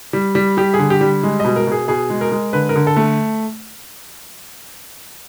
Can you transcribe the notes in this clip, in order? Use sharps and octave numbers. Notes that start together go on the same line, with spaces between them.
G3
G3
G3 G4
G#4
D3
G4
G3
G#3
B2 D#5
A#4
B2 G#4
B2 G#4
G#3
A#4
G#3
D3 B4
A#4
D3
A4
A3